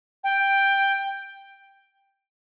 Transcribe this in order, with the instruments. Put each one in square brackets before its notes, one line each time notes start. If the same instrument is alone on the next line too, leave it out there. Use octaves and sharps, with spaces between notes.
[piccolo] G5